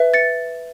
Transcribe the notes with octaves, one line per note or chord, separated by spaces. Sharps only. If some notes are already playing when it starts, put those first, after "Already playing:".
Already playing: B4 E5
A6 C#7